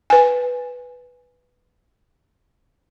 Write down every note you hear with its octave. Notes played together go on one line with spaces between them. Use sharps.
B4 G#5